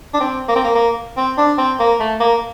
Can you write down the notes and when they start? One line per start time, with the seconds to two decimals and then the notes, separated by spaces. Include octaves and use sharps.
0.14 D4
0.20 C4
0.49 A#3
0.56 C4
0.64 A#3
0.75 A#3
1.17 C4
1.38 D4
1.58 C4
1.79 A#3
2.00 A3
2.20 A#3